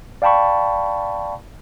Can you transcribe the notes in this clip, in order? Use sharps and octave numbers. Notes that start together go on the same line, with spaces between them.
D5 F5 G5 A5 B5 C#6